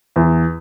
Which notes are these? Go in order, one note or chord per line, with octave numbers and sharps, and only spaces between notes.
E2